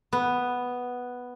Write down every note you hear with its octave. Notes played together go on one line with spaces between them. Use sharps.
B3